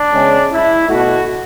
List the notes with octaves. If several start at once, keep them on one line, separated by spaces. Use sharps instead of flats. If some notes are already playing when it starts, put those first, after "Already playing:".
Already playing: D4
C#3 G#3 B3
E4
B2 A3 F#4